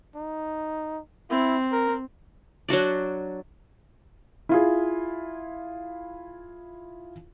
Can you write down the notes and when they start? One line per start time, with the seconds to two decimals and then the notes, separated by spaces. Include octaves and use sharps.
0.16 D#4
1.30 C4 E4
1.73 A#4
2.69 F#3 D4 F#4 D5
4.49 E4 F4 G#4